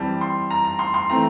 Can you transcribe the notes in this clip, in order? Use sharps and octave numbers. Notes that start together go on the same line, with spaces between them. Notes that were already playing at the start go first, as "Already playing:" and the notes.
Already playing: E3 G3 C4 A5
C6
A#5
A#5
C6
C6
E3 A3 C4 A#5